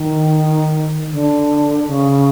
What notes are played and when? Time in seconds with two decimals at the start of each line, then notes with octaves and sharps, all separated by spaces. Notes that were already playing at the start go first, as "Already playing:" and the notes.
Already playing: D#3
1.12 D3
1.87 C#3